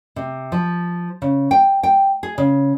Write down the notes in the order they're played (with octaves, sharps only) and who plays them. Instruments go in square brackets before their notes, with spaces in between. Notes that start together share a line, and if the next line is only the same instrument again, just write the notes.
[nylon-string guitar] C3
F3
C#3
G5
G5
G#4
C#3